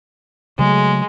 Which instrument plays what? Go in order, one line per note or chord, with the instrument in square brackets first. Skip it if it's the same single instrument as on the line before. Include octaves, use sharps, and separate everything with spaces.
[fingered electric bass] C#3 F#3 A3 [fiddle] G#3